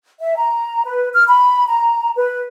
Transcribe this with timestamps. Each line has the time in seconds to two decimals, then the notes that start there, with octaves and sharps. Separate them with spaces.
0.19 E5
0.37 A#5
0.85 B4
1.14 F6
1.28 B5
1.68 A#5
2.16 B4